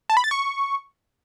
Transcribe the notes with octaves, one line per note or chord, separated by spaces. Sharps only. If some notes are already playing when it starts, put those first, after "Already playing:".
A5
B5
A6
C#6